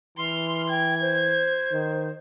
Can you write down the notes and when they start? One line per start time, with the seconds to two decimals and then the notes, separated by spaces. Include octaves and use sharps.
0.18 E3 C6 F6
0.70 G5 G#6
1.01 C5
1.72 D#3